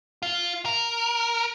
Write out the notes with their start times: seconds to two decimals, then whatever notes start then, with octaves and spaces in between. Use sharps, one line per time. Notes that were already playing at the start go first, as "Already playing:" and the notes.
0.23 F4
0.65 A#4